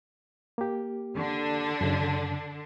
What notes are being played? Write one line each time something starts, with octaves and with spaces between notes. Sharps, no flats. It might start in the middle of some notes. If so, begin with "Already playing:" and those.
A#3 G4
D3 D4
F#2 C#3